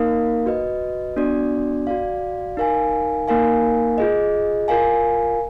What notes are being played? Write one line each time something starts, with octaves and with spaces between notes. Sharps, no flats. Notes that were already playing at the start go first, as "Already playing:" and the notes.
Already playing: A#3 D#4 A#4 F5
F#4 B4 D#5
B3 D4 F#4 D5
F#4 D5 F5
D#4 A#4 F5 G#5
A#3 D#4 A#4 F5 G#5
F4 G#4 D#5
F4 A#4 F5 G#5